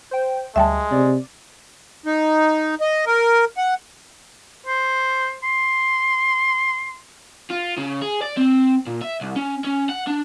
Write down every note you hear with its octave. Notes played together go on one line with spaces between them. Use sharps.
C5 G5
D2 G3 G#3 E5 G5 A5
C3 D5
D#4
D#5
A#4
F#5
C5
C6
F4
C#3
G#4
D5
C4
A#2
E5
C2
C#4
C#4
F#5
D4